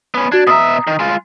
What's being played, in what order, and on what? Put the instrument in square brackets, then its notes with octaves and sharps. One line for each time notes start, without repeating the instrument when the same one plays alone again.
[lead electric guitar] B3 C#4
[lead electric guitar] D4 [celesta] F#4 G#6
[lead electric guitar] B2 E5 [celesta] A#5 D#6
[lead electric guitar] D#3
G#3 F4